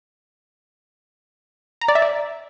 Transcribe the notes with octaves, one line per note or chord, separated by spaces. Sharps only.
A#5
D5
E5
D5